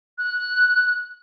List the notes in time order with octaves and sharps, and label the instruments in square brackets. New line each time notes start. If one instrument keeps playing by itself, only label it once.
[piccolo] F#6